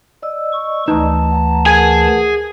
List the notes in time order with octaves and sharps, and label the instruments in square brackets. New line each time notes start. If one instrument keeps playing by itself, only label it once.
[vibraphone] D5 D#5 E6
[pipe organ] C#6
[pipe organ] D2 E3 A5 [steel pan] D#4
[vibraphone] F#5 A#5
[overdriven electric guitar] G#4 [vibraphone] A#4 F#5 [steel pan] G#5